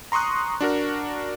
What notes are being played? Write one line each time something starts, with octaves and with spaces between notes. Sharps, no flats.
A#5 C6 C#6 D#6 F#6
D4 F#4 A#4